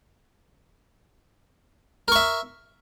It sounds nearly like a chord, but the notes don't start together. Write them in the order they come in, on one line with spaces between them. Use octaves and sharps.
A#4 C#6 E5